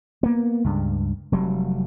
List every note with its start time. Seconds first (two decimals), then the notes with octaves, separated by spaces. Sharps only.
0.23 A#3 B3
0.64 C#2 G2
1.32 F1 F#3 G3